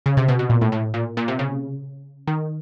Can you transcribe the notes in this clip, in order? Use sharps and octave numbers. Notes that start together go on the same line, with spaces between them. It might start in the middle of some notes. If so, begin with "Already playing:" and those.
C#3
C3
B2
B2
A#2
A2
A2
A#2
A#2
C3
C#3
D#3